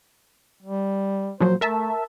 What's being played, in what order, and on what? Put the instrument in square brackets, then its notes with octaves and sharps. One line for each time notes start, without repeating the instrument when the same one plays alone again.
[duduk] G3
[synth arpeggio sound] A#2 F3 F#3 [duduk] C5
[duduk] A3 [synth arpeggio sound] A#4 E5 A5